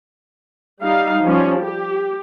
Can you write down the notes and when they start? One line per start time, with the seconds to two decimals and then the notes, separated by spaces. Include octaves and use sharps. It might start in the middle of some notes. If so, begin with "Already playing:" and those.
0.82 G3 D#4 F5
1.24 F3 G3 C#4
1.61 G4